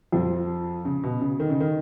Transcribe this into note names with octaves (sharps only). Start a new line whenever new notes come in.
F2 F3
C#3
B2
C#3
D#3
C#3
D#3